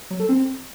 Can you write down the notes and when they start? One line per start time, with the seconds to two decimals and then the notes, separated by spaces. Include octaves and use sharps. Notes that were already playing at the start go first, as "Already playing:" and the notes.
0.10 F#3
0.20 A4
0.29 C4